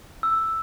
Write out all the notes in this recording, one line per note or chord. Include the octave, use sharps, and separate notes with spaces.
E6